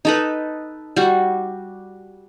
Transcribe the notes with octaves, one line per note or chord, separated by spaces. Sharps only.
D#4 A4 B4
G3 F#4